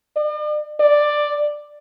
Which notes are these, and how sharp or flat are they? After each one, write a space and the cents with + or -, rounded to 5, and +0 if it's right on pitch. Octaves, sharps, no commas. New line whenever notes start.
D5 +45
D5 +5